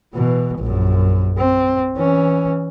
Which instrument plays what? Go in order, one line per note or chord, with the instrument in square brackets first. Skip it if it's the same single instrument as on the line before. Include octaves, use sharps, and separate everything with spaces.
[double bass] B2 E3
A#1 F#2
C4
E3 C#4